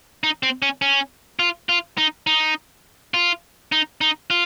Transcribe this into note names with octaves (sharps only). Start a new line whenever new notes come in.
D#4
C4
C#4
C#4
F4
F4
D#4
D#4
F4
D#4
D#4
F4